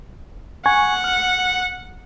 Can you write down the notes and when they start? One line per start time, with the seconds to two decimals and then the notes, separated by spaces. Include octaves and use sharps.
0.66 F#5 G#5 C#6 G#6
1.04 F6